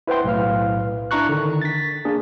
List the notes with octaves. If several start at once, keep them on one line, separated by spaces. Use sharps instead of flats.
E4 B4 C5 F#5 G5 C6
B1 A2 B4 F5 F6
D4 E4 A#5 C#6 F#6
D3 D#3
A6 B6
A#3 D4 G#4